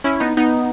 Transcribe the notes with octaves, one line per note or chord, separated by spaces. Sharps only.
C#4 E4
B3 D#4
B3 D#4